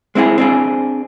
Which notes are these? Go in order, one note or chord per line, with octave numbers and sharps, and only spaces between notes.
G#3 C4 E4 F#4 G#4
C4 D4 G#4